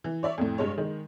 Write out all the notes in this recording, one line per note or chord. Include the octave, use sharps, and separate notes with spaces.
E3
C#5 D5 E5
F2 A2
G2 G#3 C#5
D#3 G#3